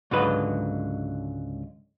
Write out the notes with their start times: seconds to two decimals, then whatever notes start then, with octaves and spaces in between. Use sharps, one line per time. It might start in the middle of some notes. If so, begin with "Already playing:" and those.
0.11 C#2 G#2 D3 F#3 B4 D#5